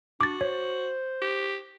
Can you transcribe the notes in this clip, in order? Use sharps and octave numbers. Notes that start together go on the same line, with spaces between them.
D4 F#4 D6 A6
C5 C#5
G4